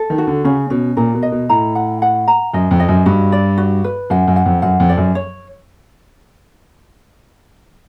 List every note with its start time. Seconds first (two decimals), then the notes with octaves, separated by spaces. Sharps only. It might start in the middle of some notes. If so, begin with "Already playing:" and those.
Already playing: A4
0.10 D#3
0.18 F#4
0.27 D3
0.44 C#3 C#4
0.70 B2 C#4
0.97 A#2 A#4
1.14 B2
1.23 D#5
1.32 B2
1.49 A2 A#5
1.75 F#5
2.02 F#5
2.28 A#5
2.54 F#2 D#5
2.71 F2
2.80 D#5
2.88 F#2
3.06 G2 F#4
3.32 D5
3.58 F#4
3.84 B4
4.10 F#2 F#5
4.28 F#2
4.36 F#5
4.46 F2
4.62 F#2 F#5
4.80 F2
4.89 D5
4.97 F#2
5.15 C#5